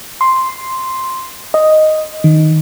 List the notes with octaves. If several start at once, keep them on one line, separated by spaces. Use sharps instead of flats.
C6
D#5
D#3